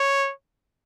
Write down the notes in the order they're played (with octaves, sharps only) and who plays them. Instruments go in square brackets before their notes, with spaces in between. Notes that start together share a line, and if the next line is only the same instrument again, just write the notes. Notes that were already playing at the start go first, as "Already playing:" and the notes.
Already playing: [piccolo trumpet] C#5